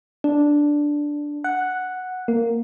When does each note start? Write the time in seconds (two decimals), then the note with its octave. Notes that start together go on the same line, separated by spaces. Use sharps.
0.24 D4
1.44 F#5
2.28 A#3